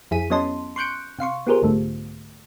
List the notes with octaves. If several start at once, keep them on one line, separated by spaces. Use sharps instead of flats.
F2 E4 G#4 B6 D#7
F#3 B3 C#4 D#5 A5 C6
C6 C#6 F#6 G6 C#7 D7
C3 F5 C6 C#6
B3 F4 G4 G#4 A#4 C5
C2 G#2 D3 A3